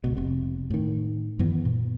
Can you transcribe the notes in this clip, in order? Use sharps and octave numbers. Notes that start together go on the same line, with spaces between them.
C#2 B2
F1 C3
A2 D#3
F#2 D#3 E3 B3
A#2